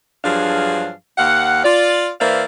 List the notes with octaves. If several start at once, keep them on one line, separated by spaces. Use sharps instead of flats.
G2 F3 F#3 D4 G#4 F5
D#2 G4 F5 F#5
F4 D5
E3 A#3 C5 D5 E5 F5